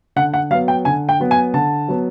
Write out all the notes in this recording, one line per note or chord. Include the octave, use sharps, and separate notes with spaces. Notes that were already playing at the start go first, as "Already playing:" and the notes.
D3 F#5
F#5
F#3 B3 F5
G5
D3 G#5
G5
F#3 B3
G#5
D3 A5
F#3 B3